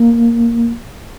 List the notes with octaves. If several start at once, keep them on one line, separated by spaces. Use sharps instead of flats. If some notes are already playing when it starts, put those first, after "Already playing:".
Already playing: A#3